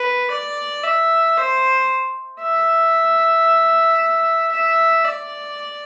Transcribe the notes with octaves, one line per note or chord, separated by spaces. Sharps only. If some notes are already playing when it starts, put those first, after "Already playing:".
Already playing: B4
D5
E5
C5
E5
E5
D5